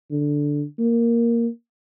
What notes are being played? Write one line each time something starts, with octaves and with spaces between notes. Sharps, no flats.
D3
A#3